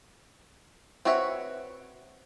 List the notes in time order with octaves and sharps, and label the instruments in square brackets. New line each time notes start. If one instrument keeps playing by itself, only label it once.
[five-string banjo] C4 F#4 B4 C#5 E5